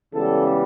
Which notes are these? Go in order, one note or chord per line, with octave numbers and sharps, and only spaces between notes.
C#2 C#3 E3 G3 B3 A4